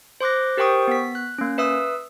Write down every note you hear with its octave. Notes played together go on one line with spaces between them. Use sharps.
C5 C6 D6 F#6 A#6
G4 A#4 C5 G5 C#6 D#6
B3 B6
F#6
A#3 C#4
B4 E5 D#6 E6